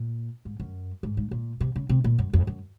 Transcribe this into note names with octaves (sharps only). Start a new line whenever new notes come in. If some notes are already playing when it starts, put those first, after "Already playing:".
Already playing: A#2
G#2
F#2
G#2
G#2
A#2
C3
C#3
C3
A#2
F#2
F2
F#2